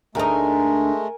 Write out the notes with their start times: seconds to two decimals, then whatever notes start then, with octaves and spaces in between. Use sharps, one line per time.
0.15 D2 G#3 A3 D#4 A#4 G#5 A#5